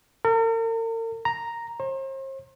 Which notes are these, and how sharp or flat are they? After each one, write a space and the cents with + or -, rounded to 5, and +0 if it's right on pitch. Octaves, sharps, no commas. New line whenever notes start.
A#4 -45
A#5 +0
C5 +40